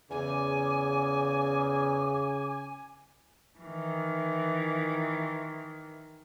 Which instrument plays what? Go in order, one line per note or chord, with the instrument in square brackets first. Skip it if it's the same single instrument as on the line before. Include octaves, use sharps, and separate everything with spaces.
[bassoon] E2 [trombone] C#3 [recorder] G#5 [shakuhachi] D6
[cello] D#3 E3